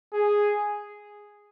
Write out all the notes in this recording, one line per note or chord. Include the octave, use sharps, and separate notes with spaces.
G#4